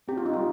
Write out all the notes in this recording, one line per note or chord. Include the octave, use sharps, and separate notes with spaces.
C4 G4
F4
D#4
G3 F4